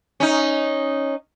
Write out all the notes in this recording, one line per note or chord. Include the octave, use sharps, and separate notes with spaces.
C#4 D#4